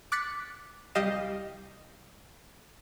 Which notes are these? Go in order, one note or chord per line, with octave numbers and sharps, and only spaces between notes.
D6 F#6 A6 B6 C#7
C2 G3 G4 D#5 F5 E7